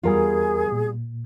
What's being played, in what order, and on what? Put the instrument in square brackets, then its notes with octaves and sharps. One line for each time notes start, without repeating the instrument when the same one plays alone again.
[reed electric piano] E2 A#4 G#5 [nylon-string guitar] G3 B3 F4 [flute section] G#4
[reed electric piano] A#2